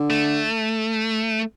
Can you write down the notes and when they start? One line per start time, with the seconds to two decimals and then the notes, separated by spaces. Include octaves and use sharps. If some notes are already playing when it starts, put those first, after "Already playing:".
Already playing: D3
0.10 A3